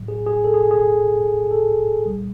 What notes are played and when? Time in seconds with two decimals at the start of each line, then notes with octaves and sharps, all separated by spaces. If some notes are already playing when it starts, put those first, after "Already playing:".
Already playing: A2 F#3
0.08 G#4
0.26 G#4
0.44 A4
0.54 G#4
0.71 G#4
1.51 A4
2.05 C2 A#2 G3